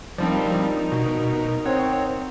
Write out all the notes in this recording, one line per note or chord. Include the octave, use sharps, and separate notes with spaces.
F3 G3 C4 D4 D#4 F4 A#4 D5
B2 F#4
C4 C#5 F#5